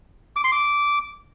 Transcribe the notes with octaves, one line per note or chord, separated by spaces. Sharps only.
D6
C6
D6